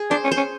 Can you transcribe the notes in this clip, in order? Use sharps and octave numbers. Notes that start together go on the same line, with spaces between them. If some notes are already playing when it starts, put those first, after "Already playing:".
Already playing: G#4
D4 C5
C#4
C5
C#4